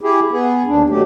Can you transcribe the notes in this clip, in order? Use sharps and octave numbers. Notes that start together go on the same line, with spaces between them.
E4 G4 G#4
B3 G#4
D#2 D4
B2 F#3 A3 G4